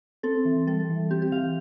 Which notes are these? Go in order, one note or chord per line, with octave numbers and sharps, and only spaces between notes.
C4 A4
E3
G3 A4
E3
C4 G4
G4
E3 F5